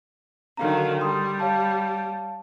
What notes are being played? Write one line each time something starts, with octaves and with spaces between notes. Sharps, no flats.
D3 D#3 F#3 D#4 F5 A#5
G3 G5 C6 D#6
C#5 F5 A5